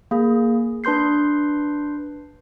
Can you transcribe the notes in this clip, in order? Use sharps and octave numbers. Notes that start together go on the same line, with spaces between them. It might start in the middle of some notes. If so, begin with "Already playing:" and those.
A#3 G#4
D4 B4 C6 G6 C7